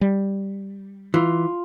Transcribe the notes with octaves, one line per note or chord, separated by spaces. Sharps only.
G3
E3 F4